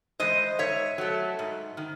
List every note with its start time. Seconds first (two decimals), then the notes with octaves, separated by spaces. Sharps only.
0.20 E3 G#3 C5 D#5
0.59 G#2 C#5 E5
0.98 F#3 A3
1.39 G#2
1.77 D#3